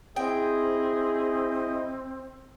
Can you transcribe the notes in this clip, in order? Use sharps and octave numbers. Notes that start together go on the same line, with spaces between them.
C4 E4 G#4 D#5 G5